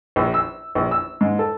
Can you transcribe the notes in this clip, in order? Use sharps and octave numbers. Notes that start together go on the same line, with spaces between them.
A#1
E6
A#1
E6
G#2
A4